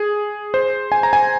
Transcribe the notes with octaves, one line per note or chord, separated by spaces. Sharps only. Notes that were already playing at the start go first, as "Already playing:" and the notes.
Already playing: G#4
C5
G#5
A#5
G#5